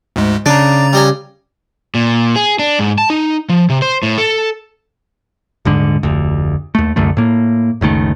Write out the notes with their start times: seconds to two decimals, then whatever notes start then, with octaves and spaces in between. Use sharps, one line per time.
0.16 D2 G#2 G#3
0.46 C#3 D4 A#5 A6
0.93 G3 D#5 G#5
1.95 A#2
2.36 G#4
2.59 D4
2.79 G#2
2.98 A5
3.10 D#4
3.49 F3
3.70 C3
3.82 C5
4.03 A2
4.18 A4
5.65 D#1 G#2 D3
6.03 F1 D2
6.75 D#2 A3
6.96 C2 F#2 D3 A3
7.17 A2 A#3
7.81 F#1 C#2 D#3 A3